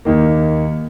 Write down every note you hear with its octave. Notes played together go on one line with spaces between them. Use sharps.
D#2 D#3 A#3